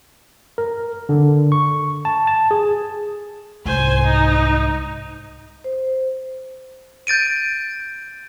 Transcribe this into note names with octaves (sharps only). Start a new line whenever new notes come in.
A#4
D3
C#6
A5
A5
G#4
C2 G#2 C5 G#5
D#4
C5
G6 A6 D7 D#7